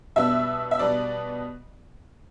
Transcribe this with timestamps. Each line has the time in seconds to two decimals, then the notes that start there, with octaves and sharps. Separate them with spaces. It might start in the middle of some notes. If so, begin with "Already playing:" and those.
0.16 B2 G3 B3 D4 E5
0.71 E5
0.79 B2 G3 B3 D4 D5